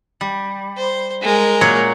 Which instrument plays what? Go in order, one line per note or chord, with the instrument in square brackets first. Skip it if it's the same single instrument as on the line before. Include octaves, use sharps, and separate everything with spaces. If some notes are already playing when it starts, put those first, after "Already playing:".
[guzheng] G3
[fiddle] C5
G#3 A#4
[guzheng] A#2 F#3 C#5